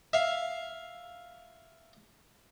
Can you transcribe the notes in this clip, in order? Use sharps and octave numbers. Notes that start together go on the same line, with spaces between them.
E5 F5